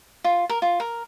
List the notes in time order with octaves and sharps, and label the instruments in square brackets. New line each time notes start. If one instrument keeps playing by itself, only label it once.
[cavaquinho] F4
A#4
F4
A#4